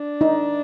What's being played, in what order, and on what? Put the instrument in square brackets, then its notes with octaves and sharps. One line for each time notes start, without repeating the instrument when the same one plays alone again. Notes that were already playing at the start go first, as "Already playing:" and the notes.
Already playing: [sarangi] D4
[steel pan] D#4